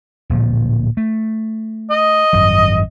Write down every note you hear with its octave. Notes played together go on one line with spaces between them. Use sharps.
D1 A#2 F3
A3
D#5
G#1 F#2